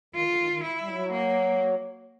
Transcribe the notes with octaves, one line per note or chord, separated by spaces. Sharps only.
D#3 F4
D3
D#3
D#3
E4
G3
F#3
A#3